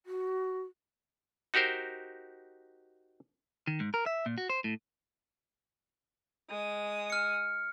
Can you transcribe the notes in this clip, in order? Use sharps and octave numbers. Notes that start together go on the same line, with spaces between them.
F#4
D#4 F#4 G4 A#4 C5
D#3
G#2
A#4
E5
A#2
F#4
C5
A2
G#3 D#6
F6 C#7